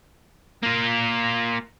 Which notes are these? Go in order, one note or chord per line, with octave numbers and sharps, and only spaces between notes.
A#3 F4